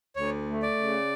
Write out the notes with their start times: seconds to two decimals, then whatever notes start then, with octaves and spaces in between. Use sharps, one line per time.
0.16 D2 C#5
0.47 A3
0.62 D5
0.78 C#3